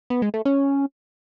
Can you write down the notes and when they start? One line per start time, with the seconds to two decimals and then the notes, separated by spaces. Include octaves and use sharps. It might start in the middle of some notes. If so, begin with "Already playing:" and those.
0.10 B3
0.22 G#3
0.34 A3
0.45 C#4